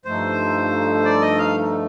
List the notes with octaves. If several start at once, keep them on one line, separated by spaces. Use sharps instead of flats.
G2 F3 A3 D#4 A4 C5
D5
D#5
F5